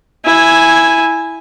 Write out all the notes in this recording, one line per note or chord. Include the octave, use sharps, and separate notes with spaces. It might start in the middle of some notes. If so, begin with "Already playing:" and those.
E4 G#5